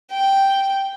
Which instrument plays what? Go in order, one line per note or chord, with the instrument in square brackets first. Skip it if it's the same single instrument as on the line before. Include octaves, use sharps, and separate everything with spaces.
[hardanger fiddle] G5